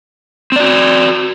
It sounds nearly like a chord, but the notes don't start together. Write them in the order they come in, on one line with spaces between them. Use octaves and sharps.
C4 D5 F#4